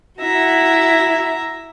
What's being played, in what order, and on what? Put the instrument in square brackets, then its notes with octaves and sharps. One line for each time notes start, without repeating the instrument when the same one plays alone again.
[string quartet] E4 F#4 [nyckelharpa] E5 A#5